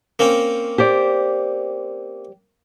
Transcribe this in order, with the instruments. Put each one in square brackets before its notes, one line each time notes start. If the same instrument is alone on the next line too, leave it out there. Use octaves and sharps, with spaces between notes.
[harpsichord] A#3 C4 C#4
[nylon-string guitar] G4 C5 D5